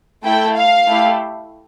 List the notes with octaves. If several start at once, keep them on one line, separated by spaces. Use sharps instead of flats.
A3 E4 A4 G5
F5
A3 E4 G4